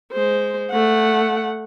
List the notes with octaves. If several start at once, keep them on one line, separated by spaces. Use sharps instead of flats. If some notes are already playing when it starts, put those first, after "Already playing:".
G#3 C5
A3 F#5